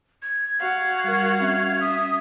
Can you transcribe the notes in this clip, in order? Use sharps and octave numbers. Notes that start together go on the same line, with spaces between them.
G#6
F#4 F5 F#5
G3 A#4
C4 C#4 E5
C#4 E5 D#6